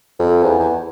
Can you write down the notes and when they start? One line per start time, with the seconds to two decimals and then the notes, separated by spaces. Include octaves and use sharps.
0.19 F2
0.43 E2
0.59 E2